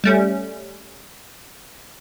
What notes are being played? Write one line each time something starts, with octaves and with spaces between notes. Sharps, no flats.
G3 A3 C#4